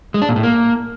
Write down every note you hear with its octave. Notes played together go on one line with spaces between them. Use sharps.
G#3
D4
A#2
A2
A#3